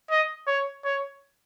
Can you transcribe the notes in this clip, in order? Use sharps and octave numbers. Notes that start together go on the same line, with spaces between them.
D#5
C#5
C#5